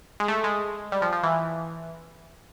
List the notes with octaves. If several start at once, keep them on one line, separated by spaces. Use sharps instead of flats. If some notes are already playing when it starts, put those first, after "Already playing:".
G#3
A3
G#3
G3
F3
F3
E3